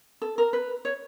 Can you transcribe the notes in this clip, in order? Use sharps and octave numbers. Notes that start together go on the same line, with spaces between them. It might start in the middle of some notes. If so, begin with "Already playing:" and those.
A4
A#4
B4
C#5